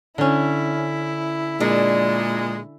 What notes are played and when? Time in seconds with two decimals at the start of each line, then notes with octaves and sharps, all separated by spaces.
0.18 D3 C#4 E4
1.60 A#2 G#3 D4